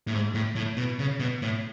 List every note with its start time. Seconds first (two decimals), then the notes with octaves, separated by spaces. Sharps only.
0.07 A2
0.13 G#2
0.35 A2
0.56 A2
0.77 B2
0.99 C#3
1.20 B2
1.42 A2